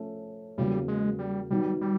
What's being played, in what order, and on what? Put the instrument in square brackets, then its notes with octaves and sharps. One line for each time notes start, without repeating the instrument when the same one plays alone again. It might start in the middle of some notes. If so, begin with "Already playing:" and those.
Already playing: [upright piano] F3 A3 C#4
[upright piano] E2 C#3 F#3 A#3 [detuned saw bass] G3
[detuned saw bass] G#3
G3
[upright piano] D#3 F#3 B3 D#4 [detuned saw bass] G3
[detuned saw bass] G3